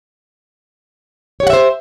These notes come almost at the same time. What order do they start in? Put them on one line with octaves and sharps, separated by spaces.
C#5 G4 F#5 E5 C5